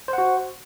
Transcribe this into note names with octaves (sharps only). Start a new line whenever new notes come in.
F#4 C5 F#5